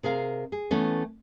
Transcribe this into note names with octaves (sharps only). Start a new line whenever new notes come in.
C3 G#4 A#4 F5
G#4
E3 A3 B3 C#4